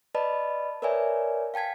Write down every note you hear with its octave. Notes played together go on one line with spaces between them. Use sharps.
B4 D5 D#5 A5 B5
A#4 B4 C#5 D5 E5 G#5
F5 G5 A5 G#6 B6